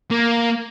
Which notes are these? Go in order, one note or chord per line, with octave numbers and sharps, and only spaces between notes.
A#3